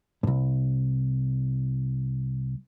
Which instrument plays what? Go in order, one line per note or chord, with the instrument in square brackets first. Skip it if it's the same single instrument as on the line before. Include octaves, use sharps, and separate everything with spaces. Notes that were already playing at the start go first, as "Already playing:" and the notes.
[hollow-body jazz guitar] C2 G2